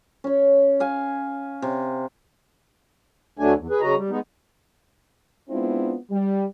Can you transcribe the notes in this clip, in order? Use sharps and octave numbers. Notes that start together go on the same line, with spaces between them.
C#4 C#5
F5 G#5
C3
D2 F#3 A3 D4 G#5
E2
G#4 B4
C#3 F#3 F#4 D#5 A#5
G3
G#3 B3 D#4
G#3 B3 C4 D4 E4 F4
G3